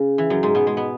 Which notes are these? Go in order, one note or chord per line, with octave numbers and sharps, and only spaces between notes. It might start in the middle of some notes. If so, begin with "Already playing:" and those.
Already playing: C#3
E3
F#2 F#3
G#2 G#3
B2 B3
G#3
B3